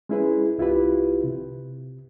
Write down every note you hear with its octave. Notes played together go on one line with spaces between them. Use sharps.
G#3 C#4 E4 G#4 B4
C2 E4 F4 G4 B4
C3